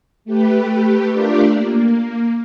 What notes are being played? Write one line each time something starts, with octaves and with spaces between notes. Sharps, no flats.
A3 G4 B4
A3 D4 F4 G4 A#4 D5
A#3